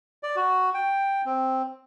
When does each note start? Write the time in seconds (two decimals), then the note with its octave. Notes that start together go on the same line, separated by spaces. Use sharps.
0.23 D5
0.36 F#4
0.74 G5
1.26 C4